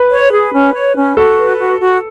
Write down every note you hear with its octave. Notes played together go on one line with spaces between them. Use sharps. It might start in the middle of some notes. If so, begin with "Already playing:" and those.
Already playing: B4
C#5
G#4
C#4
C#5
C#4
F#4 A4
B4
F#4
F#4